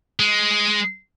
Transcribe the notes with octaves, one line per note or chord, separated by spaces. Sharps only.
G#3